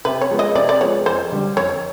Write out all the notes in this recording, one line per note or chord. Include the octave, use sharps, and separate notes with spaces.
C3 B4
C#5
F3 G#3 B3
D#5
C3 D5
D5
F3 G#3 B3 C#5
F2 C5
D3 G3
F2 C#5